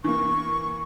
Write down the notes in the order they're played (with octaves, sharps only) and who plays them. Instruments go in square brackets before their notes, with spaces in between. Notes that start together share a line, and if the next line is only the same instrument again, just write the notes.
[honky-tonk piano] E3 A#3 [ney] C#6